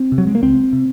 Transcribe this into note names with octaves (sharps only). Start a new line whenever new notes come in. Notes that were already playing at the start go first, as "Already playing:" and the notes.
Already playing: C4
C3
F#3
G#3
A#3
C#2 C4
C3